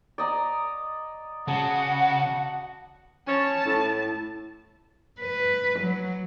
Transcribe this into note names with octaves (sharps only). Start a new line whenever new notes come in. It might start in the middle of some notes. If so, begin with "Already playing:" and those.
D5 D#5 A#5
C#3 F#4 F#5 A5
C#4 A5
A2
B4
F#3